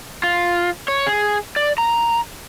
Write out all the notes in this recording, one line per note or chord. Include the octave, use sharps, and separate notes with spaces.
F4
C#5
G#4
D5
A#5